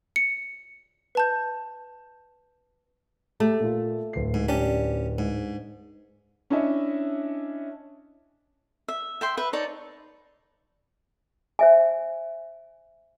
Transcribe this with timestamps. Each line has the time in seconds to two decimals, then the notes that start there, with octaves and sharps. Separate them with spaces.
0.16 C#7
1.15 B4 A5 G6
3.40 A3 G4
3.60 A#2 F4
4.13 D1 C7
4.34 G#2
4.48 C#4 D4 G4
5.18 G#2
6.50 C#4 D4 E4 C#5 D#5 E5
8.88 E5
9.21 E5 G5 C6
9.37 B4 E5
9.53 D#4 C#5 D5 A5
11.59 C5 E5 G#5